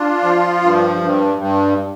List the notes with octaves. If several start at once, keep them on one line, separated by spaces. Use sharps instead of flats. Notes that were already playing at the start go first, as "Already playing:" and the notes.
Already playing: D4 F4
F3
G2
G2
G2